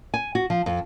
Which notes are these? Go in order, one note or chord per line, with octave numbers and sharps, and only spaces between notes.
G#5
F#4
F3
F2